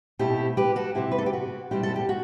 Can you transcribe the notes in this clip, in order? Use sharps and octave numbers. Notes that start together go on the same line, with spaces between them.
B2 A3 C4 E4 G4
G4 B4
F#4 A4
C3 F#3 C4 E4 G4
B4
A4
G4
F#4
B2 G3 C4 E4 G4
A4
G4
F#4